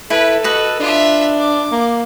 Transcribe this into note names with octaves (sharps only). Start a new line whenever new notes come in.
E4 A4 B4
F#4 B4 D#5
D4 F4 E5
D6
A#3